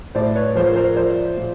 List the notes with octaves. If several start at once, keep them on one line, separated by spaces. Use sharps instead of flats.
A2 C5 D5
B4 C#5
F3 A#4 C5
A#4 C5
F3 C5 D5
A#2